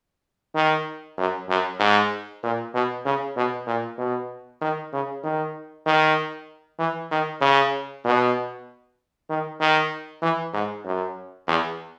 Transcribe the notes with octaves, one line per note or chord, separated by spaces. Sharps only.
D#3
F#2
F#2
G#2
A#2
B2
C#3
B2
A#2
B2
D#3
C#3
D#3
D#3
E3
D#3
C#3
B2
D#3
D#3
E3
G#2
F#2
E2